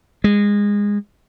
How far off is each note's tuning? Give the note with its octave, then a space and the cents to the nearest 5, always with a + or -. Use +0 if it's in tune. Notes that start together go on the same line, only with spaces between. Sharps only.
G#3 -20